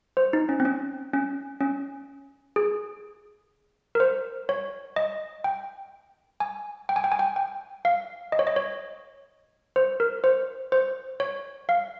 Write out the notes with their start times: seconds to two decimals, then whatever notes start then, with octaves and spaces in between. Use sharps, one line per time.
0.17 C5
0.33 D#4
0.49 C#4
0.60 C4
0.65 C#4
1.13 C#4
1.61 C#4
2.56 G#4
3.95 A#4
4.00 C5
4.49 C#5
4.96 D#5
5.44 G5
6.40 G#5
6.89 G5
6.96 G#5
7.04 G5
7.12 G#5
7.19 G5
7.36 G5
7.85 F5
8.32 D#5
8.39 C#5
8.47 D#5
8.56 C#5
9.76 C5
10.00 A#4
10.24 C5
10.72 C5
11.20 C#5
11.69 F5